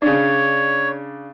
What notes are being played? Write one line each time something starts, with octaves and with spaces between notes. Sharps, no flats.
C#3 D4 C#5